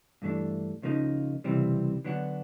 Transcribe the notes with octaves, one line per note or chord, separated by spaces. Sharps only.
G2 E3 A3 D4
C#2 C#3 F3 A#3 D#4
C#2 C3 E3 G3 C4
D3 F#3 B3 D4 F#4